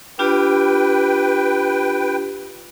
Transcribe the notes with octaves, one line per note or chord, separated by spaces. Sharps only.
D4 F4 G4 B4 G5